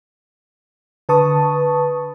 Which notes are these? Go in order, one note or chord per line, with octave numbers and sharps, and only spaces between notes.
D3 B4 A5 C#6 D#6